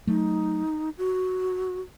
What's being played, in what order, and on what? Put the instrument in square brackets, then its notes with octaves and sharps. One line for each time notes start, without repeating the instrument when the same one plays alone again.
[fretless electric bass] F#3 A3 [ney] D#4
[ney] F#4